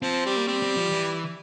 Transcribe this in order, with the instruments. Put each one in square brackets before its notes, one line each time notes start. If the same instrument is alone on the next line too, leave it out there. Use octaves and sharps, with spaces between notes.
[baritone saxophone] F3 [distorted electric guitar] C4
[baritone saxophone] G3
[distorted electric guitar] A#3
[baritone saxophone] G3 [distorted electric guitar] C4
[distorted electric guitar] C4
F3
E3